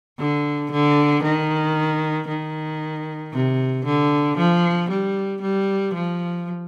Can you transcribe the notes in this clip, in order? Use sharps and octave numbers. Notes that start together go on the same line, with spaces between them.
D3
D3
D#3
D#3
C3
D3
F3
G3
G3
F3